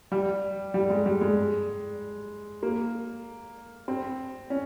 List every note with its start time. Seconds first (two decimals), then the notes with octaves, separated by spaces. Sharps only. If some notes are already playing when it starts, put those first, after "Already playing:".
0.12 G3
0.74 G3
0.90 G#3
1.06 G3
1.21 G#3
2.63 A#3
3.88 C4
4.50 C#4